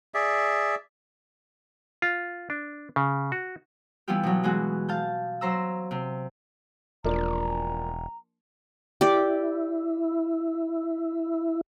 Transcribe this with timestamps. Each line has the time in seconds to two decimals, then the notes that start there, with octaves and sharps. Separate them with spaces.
0.14 G#4 D5 E5
2.02 F4
2.50 D4
2.96 C#3
3.32 F#4
4.08 E3 G3 B3 E4 F4 G4
4.23 B2 F#3
4.43 E3 G#3 B3 F#4
4.88 F5 A5 G6
5.41 F#3 C5 A#5 E6
5.91 C3
7.04 E1 F3 A#3 D4 A#5
9.01 E4 G4 D5